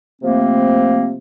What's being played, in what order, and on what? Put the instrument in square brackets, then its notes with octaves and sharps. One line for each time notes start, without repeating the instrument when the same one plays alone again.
[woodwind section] C3 F3 A3 A#3 C4